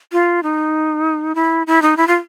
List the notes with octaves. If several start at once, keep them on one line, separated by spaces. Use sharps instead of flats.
F4
D#4
E4
E4
D#4
E4
F4